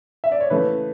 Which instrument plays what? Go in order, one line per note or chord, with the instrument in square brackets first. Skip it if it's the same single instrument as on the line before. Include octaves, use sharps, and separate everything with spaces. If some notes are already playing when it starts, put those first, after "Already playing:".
[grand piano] E5
D5
C#5
C#3 E3 A3 B4